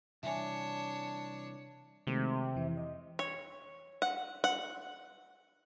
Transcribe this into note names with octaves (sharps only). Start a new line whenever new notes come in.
C3 E3 G3 D4 C#5 E5 G#5
C3 D#3 G#3 A3
F2 E3
D#5
C#5
F#5
F#5